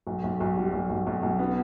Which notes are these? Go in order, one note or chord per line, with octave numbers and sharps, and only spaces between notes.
B1
B1
B1
G3
B1
B1
B1
B1
B3